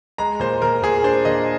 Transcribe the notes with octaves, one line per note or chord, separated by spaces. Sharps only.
G#3 A#5
A#2 C5
A#2 A#4
A#2 G#4
D4 C5
A#2 D#5